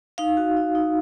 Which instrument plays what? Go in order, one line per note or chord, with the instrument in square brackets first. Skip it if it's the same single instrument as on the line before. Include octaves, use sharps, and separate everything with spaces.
[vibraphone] D#4 F5
F#4
D#4
D#4